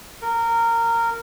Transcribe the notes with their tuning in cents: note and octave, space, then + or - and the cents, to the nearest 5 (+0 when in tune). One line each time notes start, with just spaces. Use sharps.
A#4 -15